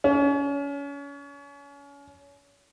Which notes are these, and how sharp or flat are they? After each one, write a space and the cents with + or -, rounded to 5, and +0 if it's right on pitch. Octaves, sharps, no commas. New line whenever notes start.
C#4 +30